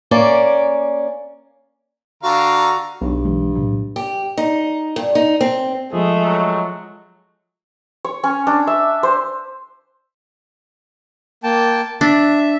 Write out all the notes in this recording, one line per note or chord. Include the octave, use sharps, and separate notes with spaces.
A#3 C#4 D5
D3 F#4 F5 A#5
B1 G2
E3 G#3
A2 C3 F#3
G4
D#4
G2
D#4
C4
F3 G#3 A3 G#4
F#3
C#5
C#4
D4
E5
C5
A#3 G5 A5
D4 E5